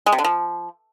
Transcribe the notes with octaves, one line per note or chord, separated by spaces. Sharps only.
G#3
C3
D3
F3